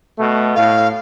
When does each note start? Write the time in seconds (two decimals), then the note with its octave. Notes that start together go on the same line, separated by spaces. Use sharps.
0.18 B2 A3
0.55 A2 F5